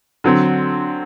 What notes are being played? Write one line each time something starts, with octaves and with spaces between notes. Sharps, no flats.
D3 F#3 C4